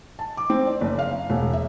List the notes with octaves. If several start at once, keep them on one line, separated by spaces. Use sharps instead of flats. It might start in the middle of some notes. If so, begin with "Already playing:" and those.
A5
D6
C4
D5
F#1
F5
E1
E5